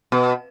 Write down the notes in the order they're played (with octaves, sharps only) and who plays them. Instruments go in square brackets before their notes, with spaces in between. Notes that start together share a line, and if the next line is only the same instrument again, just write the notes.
[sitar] B2